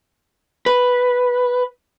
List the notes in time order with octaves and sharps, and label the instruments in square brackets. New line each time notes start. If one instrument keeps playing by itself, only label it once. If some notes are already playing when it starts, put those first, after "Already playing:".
[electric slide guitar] B4